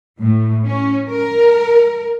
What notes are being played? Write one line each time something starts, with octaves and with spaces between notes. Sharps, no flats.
A2
C#4
A#4